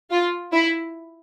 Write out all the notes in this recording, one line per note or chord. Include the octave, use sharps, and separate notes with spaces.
F4
E4